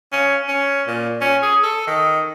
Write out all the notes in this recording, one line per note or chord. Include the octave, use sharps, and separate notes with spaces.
C#4
C#4
A#2
C#4
G#4
A4
D#3